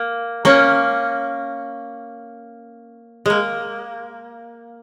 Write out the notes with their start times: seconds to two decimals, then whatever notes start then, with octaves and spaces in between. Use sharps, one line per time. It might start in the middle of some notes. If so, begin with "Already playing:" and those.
Already playing: A#3
0.45 A#3 C#4
3.26 G#3 A#3